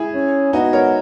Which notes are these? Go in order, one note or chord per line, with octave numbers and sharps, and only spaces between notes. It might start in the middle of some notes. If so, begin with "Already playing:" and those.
Already playing: E4 G#4
C#4
B3 D#4 F#4
A#4 C#5